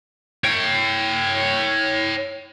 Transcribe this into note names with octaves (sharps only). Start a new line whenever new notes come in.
C#5 G5